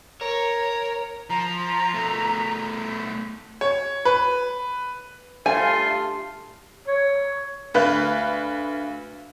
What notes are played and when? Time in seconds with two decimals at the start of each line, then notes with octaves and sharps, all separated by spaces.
0.21 A#4 C#5
1.30 F3 A#5
1.94 B2 A3
3.61 C#5
4.05 B4
5.46 G2 A3 F4 G#5
6.88 C#5
7.74 D2 B4 F5 F#6